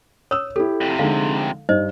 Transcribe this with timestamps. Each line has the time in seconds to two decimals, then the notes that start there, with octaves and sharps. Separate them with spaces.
0.31 C#5 D#6 E6
0.56 E4 G4 A4
0.81 F2 C3
0.99 D3 G#3 D#4 F5
1.69 G2 D#4 C5 D#5